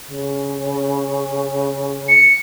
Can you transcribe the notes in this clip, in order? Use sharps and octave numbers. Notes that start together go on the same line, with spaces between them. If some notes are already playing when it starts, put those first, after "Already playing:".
C#3
C#7